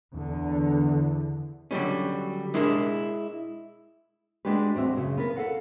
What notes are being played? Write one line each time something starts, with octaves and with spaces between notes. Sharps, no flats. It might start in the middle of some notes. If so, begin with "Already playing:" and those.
E2 D3
D3 F#3 G3 C#4
G#3 D4 E4 G#4 A#4
G#3 D4 F#4 G4 B4
E2 G3 C4 F#4 E5
F#2 C#3
B3 A#4 B4
A4 F5 F#5